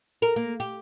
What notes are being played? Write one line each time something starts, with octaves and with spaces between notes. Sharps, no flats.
A#4
A#3
G4